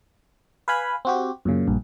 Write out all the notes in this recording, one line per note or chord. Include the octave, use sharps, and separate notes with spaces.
B4 F5 G#5 B5
C4 F#4 G4
F#2 A#2 C#3
A#1 G2